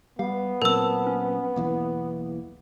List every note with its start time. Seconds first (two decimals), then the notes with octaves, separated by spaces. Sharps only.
0.19 G3 B3 F5
0.62 A#2 F#3 C4 A#4 A5 E6
1.07 C#4
1.56 B1 E2 E3 A#3